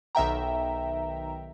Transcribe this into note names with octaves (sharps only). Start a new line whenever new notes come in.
B1 D#3 E5 G5 A#5